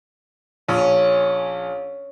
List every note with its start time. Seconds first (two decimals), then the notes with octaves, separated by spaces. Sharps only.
0.68 A#1 C#4